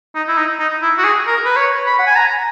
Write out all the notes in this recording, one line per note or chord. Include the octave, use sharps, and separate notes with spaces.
D#4
E4
D#4
D#4
E4
F#4
G#4
A#4
B4
C#5
B5
F#5
G#5
A#5